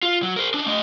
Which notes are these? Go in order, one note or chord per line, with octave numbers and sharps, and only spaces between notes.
F4
F#3
A#4 C5
D4 D#4
A3 D#5